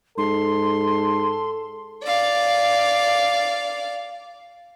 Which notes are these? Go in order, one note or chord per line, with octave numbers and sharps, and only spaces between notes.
G#2 A4 C6
D5 F5